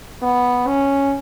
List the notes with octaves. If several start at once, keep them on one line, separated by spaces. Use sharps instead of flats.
B3
C#4